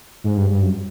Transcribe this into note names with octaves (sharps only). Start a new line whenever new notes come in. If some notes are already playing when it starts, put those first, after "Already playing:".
G#2
G2
G2
F#2